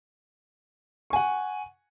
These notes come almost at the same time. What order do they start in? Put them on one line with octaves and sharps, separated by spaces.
C#6 G#5 F#5